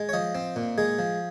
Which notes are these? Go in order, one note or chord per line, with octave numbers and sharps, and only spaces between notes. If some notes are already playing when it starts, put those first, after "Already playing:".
Already playing: G#3
C#5
F3 D#5
C4
A#2
G#3 G#4
F3